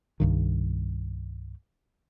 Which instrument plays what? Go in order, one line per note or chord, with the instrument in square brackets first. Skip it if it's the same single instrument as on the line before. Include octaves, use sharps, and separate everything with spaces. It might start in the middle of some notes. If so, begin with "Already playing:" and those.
[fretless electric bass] C2 G2 D#3